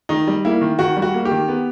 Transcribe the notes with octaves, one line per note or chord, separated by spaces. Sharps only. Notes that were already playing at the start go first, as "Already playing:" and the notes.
D#3 D#4
G3
A#3 E4
D#3
D#3 F#4
G3
F#4
A#3
G4
D#3
B3